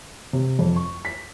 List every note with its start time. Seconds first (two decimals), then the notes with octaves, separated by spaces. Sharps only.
0.33 C3
0.59 F2
0.76 C#6
1.05 B6